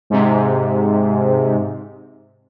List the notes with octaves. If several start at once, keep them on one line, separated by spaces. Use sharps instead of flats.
G#2 C3